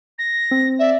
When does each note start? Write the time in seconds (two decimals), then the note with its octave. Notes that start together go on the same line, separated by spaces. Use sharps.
0.18 A#6
0.51 C4
0.79 D5 E5